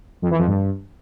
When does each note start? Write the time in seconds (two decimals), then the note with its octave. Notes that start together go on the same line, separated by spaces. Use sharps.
0.22 F2
0.31 E3
0.39 F2
0.47 G2